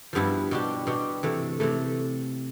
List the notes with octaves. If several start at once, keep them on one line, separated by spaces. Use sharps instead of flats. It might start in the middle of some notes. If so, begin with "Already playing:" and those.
G2 F3 B3 E4
B2 B3 D4 G4
B2 B3 D4 G4
C3 E3 A3
C3 E3 A3